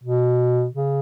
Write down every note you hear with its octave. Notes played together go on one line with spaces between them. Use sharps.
B2
C#3